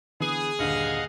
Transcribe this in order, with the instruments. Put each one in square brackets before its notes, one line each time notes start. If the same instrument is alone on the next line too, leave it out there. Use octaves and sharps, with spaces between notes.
[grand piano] D3 E3 B3 [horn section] G#4
[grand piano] D#1 G2 D3 [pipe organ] D#5 F5 F#5